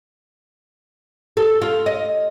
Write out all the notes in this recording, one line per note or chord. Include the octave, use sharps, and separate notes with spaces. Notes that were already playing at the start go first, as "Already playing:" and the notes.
A4
F4
D#5